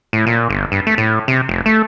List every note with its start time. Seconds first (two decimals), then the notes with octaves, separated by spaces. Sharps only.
0.13 A2
0.26 A#2
0.50 G1
0.72 G2
0.87 A3
0.98 A2
1.28 C3
1.49 F1
1.66 A3